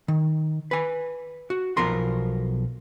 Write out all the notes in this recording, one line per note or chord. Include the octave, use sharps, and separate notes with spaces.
D#3
B4 G#5
F#4
B1 B2 F3 A#4 C6